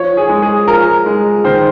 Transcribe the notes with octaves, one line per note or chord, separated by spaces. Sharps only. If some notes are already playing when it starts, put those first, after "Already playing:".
Already playing: F3 C#5
G#4
G#3
G#4
F3 A#4
G#3
D#3 C5